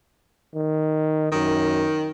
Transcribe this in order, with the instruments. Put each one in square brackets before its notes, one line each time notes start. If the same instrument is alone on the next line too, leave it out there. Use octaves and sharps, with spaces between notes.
[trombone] D#3
[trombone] F#2 [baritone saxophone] D#3